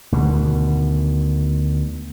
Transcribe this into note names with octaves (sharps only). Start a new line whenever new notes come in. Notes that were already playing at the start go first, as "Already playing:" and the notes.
D2 B2 D#3